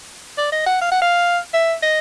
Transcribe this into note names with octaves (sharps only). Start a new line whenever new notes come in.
D5
D#5
F#5
F5
F#5
F5
E5
D#5